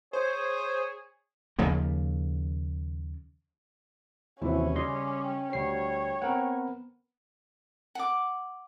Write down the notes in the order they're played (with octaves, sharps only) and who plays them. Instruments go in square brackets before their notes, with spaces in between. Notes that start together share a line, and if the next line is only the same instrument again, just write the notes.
[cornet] G#4 [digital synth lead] C5 [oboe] C#5
[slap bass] D#2 C#3 F3 A#3
[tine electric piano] D#2 C3 E3 [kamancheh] C#4 [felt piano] E4 F#4 [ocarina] C5
[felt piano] C#3 [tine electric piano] G3 D#5 C6 [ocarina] D6
[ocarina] G5
[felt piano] D2 G3 [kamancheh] C#5 [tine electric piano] C7
[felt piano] B3 [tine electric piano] C4 A#4 F#5
[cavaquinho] F#5 D6